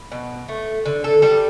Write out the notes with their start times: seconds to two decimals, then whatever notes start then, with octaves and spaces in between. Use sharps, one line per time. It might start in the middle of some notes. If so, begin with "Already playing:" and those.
Already playing: B4
0.12 B2
0.48 A3
0.85 D3
1.04 A4
1.22 G3 A4